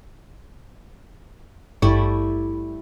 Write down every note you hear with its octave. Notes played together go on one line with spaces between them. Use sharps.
G#1 G2 G3 A3 E4 C#6